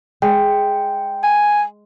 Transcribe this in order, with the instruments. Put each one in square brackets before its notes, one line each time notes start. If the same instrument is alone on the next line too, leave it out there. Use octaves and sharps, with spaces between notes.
[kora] G#3 [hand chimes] G5
[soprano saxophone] G#5